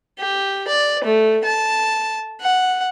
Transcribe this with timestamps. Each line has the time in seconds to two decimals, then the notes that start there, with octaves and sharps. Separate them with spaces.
0.20 G4
0.68 D5
1.04 A3
1.45 A5
2.42 F#5